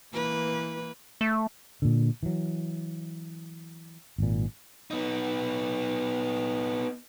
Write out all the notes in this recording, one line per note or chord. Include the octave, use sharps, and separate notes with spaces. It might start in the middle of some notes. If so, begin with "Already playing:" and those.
E3 A#3 B4
A3
A#2 D3
E3 F#3
G#1 A#2
B3 D#4